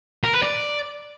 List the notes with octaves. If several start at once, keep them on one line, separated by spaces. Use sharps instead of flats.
A#4
B4
D5